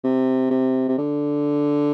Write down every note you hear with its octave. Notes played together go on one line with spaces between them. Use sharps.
C3
C3
C3
D3